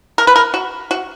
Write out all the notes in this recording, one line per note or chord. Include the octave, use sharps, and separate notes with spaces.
A#4
B4
A#4
F#4
F#4